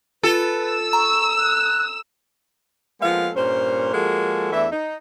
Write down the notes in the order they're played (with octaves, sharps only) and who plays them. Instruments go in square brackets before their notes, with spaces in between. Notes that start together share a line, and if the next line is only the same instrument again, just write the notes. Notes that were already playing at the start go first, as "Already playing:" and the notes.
[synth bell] F4 [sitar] A4 [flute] B4
[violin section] E6
[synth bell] A#5 [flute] C#6
[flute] F#6
[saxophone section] F3 G#3 A#3 B3 A4 F5
G2 A#2 C#4 A#4 C5
F3 G#3 A#3 F#4 A4
E2 E3 A3 D4 E5
D#4